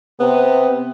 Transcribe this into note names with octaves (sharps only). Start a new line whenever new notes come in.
C3 B3